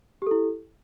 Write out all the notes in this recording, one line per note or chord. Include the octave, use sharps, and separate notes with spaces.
E4 G4 A4